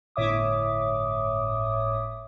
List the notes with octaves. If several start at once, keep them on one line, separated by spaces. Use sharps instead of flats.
G1 A2 C#5 E5 D6 D#6